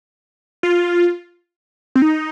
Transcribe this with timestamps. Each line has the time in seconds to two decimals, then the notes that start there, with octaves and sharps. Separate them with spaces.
0.63 F4
1.95 C4
2.02 D#4